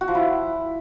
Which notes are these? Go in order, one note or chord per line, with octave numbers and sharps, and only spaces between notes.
F#4
F3
E4